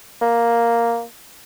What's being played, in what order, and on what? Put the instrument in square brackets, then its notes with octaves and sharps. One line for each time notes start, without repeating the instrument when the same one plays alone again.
[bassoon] A#3